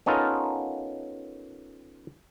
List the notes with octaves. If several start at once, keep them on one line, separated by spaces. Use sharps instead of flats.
B3 C#4 D#4 F4 A4 A#4